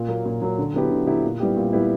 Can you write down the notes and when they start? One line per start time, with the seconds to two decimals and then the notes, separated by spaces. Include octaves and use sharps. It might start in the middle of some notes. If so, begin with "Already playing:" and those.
Already playing: A#2
0.08 F#3 A#3
0.25 A#2
0.42 F#3 A#3
0.58 D3
0.74 F#3 B3 E4 G4
0.91 D3
1.07 F#3 B3 E4 G4
1.24 A#2
1.40 G3 B3 E4 G4
1.56 A#2
1.72 G3 B3 E4 G4